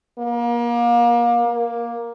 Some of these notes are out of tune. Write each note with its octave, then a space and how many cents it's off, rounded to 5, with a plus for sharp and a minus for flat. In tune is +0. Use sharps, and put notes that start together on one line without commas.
A#3 +30
A#3 +10